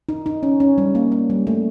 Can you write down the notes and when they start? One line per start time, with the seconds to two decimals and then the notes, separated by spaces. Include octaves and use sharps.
0.09 D#4
0.26 D#4
0.43 C#4
0.60 C#4
0.78 G3
0.95 A#3
1.12 A#3
1.30 G3
1.47 A3